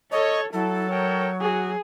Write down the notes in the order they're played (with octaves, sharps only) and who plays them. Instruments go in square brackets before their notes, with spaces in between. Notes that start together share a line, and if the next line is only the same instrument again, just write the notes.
[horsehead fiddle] A4 [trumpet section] C#5 [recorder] D#5
[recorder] F#3 [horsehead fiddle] E4 [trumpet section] A4
[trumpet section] A4 A#4 G5 [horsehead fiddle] C#5
[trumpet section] F#4 [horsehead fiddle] G#4